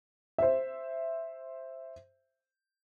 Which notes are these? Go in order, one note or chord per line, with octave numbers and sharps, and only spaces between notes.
C5 E5